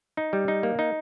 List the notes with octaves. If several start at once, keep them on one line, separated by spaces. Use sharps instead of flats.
D#4
G3
D#4
A#3
D#4